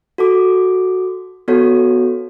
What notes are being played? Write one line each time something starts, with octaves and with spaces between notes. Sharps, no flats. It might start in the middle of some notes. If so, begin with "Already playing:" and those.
F#4 A4 D6
B3 F#4 A4 C#5